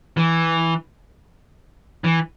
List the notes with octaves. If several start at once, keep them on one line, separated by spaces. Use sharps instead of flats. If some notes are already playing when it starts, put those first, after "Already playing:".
E3
E3